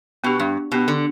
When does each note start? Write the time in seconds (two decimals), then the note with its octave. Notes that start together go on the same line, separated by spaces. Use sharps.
0.24 B2 B3 D4 G4
0.40 G2
0.72 B2 B3 D4 G4
0.88 D3